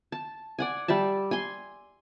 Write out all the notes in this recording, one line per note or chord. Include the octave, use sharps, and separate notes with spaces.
A5
D5 F#5 G#5
G3 D5 E5 A5
G#5 C6